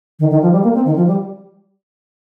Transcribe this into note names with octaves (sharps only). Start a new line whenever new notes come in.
D#3
D#3
F3
G3
A#3
C4
D#3
F3
G3